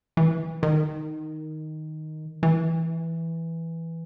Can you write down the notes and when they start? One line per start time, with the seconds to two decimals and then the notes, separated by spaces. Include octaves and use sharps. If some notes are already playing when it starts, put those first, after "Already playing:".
0.17 E3
0.63 D#3
2.43 E3